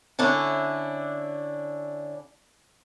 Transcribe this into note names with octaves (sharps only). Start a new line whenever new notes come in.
D3 C#4 D4 E4